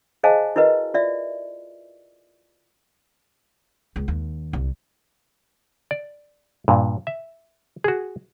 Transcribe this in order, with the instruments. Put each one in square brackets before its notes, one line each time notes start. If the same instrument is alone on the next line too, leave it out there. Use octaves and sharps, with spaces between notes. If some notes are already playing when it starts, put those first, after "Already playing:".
[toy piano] G#4 C5 D#5 F5 G#5 A5
E4 F#4 A#4 B4 D#5
F4 D5 E5
[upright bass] C#2
D#2
C2
[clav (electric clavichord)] D5
G2 A#2
E5
F#4 G#4